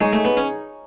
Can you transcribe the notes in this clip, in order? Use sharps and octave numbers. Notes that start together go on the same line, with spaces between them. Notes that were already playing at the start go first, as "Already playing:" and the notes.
G#3 D#4 G#4 C#5
A3
B3
C#4